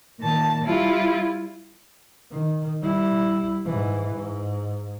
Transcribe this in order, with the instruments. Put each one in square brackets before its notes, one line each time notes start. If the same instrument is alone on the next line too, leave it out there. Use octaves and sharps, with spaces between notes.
[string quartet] A#2 D#3 A5
G3 E4 F4
[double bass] D#3
G3 E4
G#2 E3
G#2